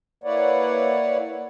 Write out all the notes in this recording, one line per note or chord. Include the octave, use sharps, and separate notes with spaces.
A#3 E4 B4 C#5 D5 F#5